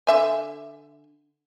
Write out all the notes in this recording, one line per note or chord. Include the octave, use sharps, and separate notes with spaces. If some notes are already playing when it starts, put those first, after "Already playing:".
D3 E5 G#5